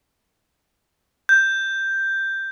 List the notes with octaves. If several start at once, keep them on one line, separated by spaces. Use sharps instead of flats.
G6